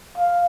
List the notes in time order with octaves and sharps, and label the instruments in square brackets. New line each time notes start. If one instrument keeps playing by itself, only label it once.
[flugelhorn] F5